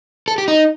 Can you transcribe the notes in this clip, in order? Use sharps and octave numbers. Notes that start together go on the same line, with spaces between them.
A4
G4
D#4